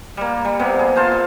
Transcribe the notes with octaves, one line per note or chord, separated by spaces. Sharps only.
G3 A#3
G3
C3 A#3 B3
G#4
F4 C5 F5 A5
A#2